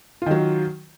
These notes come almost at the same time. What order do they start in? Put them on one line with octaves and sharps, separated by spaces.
F4 D#3 F#3